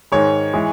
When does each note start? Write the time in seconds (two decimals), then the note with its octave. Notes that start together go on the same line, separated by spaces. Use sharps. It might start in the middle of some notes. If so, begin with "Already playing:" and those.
0.12 G#2 D#3 G#3 C#5
0.53 E3 G#3